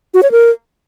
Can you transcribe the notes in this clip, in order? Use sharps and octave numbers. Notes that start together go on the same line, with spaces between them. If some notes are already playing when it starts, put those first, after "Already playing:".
F#4
C#5
A#4